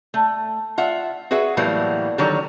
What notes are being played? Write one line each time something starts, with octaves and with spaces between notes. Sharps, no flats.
A3
F4 E5 F#5
F#4 G#4 B4 E5 F#5
A2 E3 F#3 G3 A#3 B3
D3 D#3 F#3 G3 C#5 A#5